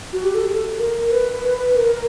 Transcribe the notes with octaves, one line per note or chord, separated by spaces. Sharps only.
F#4
G4
A4
A#4
B4
A#4